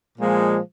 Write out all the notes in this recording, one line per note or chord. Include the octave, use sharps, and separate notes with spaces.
A#2 F3 G#3